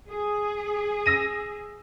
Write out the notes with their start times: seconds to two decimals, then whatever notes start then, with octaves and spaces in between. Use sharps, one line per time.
0.11 G#4
1.06 E6 A#6 D#7